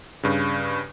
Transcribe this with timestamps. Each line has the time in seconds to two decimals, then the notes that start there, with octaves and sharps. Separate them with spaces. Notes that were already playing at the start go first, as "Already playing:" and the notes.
0.23 G2 C#3